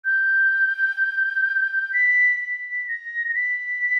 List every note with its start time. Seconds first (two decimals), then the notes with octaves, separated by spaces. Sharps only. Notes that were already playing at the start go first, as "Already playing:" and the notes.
0.05 G6
1.93 B6
2.40 B6
2.88 A#6
3.28 A#6
3.35 B6